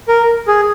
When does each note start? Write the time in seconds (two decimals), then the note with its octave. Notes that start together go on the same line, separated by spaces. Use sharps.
0.08 A#4
0.48 G#4